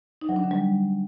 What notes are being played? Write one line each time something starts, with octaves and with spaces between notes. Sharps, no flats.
D#4
F#3
D4
D3
G3